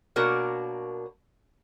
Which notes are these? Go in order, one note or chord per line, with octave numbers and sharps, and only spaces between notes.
B2 A#3 D4 F#4 A#4 C#5